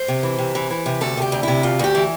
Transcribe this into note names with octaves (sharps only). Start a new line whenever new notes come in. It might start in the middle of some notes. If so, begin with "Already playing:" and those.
Already playing: C5
C3
E3
C3
E3
E3
C3
D2 A4
C3 G4
D2
C3 E4
D2 F4
D2 G4
E3